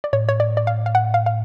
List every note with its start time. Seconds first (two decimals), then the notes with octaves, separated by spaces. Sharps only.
0.04 D5
0.13 A2 C#5
0.29 C#5
0.40 D5
0.57 D5
0.67 F5
0.86 F5
0.95 F#5
1.14 F5
1.26 F5